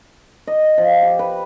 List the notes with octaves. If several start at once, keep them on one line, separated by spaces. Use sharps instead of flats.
D#5
F3
G4
B4